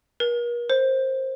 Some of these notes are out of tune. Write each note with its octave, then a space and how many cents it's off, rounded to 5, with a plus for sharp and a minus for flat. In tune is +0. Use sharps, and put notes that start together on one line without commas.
A#4 +40
C5 +20